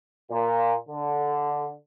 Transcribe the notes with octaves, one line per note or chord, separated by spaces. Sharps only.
A#2
D3